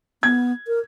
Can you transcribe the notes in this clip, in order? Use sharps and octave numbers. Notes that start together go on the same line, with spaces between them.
B3 G#6
A#4